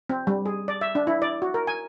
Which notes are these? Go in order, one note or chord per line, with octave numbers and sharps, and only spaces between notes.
C4
G3
G#4
D5
E5
D4
E4
D5
F#4
A#4
G#5